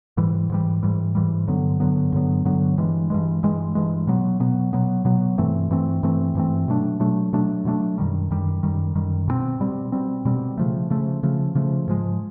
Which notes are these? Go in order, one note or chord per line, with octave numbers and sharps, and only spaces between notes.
G#2 E3 G3
G#2 E3 G3
G#2 E3 G3
G#2 E3 G3
G2 D3 F#3 B3
G2 D3 F#3 B3
G2 D3 F#3 B3
G2 D3 F#3 B3
G2 E3 G#3
G2 E3 G#3
G2 E3 G#3
G2 E3 G#3
B2 F#3 B3
B2 F#3 B3
B2 F#3 B3
B2 F#3 B3
G2 E3 A3 C4
G2 E3 A3 C4
G2 E3 A3 C4
G2 E3 A3 C4
B2 F#3 A3 D4
B2 F#3 A3 D4
B2 F#3 A3 D4
B2 F#3 A3 D4
F#2 D#3 G3
F#2 D#3 G3
F#2 D#3 G3
F#2 D#3 G3
B2 G3 C4
B2 G3 C4
B2 G3 C4
B2 G3 C4
C#3 F3 A3
C#3 F3 A3
C#3 F3 A3
C#3 F3 A3
G#2 F3 G#3